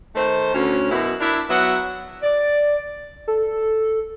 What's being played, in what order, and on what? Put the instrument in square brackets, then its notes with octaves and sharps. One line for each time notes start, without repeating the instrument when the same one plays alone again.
[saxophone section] D#3 A3 C5
D2 C#4
F#2 B2 E4
D4 E4 A#4 E5
F#3 B3 E5 F#5
[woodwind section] D5
[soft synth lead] A4